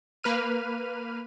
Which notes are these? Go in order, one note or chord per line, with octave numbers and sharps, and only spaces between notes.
A#3 B4 F6 D#7